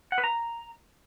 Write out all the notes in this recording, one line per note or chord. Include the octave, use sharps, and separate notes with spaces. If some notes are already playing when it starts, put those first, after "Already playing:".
F#5
B4
A#5